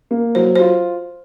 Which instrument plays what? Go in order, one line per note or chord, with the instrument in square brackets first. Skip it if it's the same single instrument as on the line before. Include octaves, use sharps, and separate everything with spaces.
[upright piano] A#3
[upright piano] F#3 [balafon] C5
[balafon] C5
[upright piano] F4